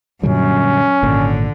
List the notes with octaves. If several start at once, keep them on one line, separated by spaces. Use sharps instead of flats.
F#2 A#2 D3 G3 C#4
G#1 A#2 D3